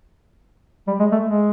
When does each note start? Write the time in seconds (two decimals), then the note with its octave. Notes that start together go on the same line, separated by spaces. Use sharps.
0.87 G3
0.99 G#3
1.12 A3
1.24 G#3